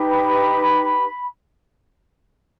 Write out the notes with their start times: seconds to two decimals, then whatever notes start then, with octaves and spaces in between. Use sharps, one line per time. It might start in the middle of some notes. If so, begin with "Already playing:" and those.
Already playing: D#4 G4 B4
0.11 B5